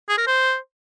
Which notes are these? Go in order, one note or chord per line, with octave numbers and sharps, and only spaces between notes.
G#4
A#4
C5